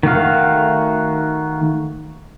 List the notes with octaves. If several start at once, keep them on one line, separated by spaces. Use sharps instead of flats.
D#3 A3 F#4 F5